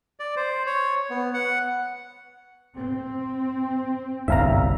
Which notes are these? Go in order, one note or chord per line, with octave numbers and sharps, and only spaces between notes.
D5
C5
C#5
B3
F#5
C4
G1 C2 F#2 E5 F5 A#5